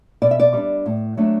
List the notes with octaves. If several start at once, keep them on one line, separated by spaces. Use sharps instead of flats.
B2 D5
E5
D5
G3 D4
A2
F#3 A3 D4